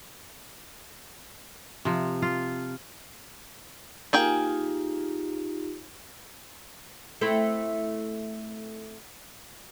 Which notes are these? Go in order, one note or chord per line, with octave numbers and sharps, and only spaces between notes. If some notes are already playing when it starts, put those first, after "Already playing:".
C3 F3
F4
A#3 D#4 F4 G4 G#4 G5
A3 C4 E4